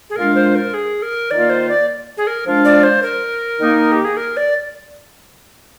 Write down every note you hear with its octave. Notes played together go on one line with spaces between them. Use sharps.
G#4
A#2 G#3 D4 F4 A#4
C5
A#4
G#4
A#4
D#3 A#3 F4 D5
C5
D5
G#4
A#4
F3 G#3 D4 F4
D5
C5
A#4
D#3 A#3 D#4
G4
G#4
A#4
D5